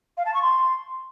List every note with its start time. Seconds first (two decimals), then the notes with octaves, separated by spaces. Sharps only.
0.17 F5
0.26 A5
0.34 C#6
0.42 C6